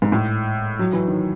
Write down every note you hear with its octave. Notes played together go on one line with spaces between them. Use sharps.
G#2
A2
F#3
E3
D#3